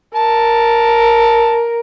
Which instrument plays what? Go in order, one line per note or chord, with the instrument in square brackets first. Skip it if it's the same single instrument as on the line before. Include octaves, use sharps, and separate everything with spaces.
[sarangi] A#4 [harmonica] A5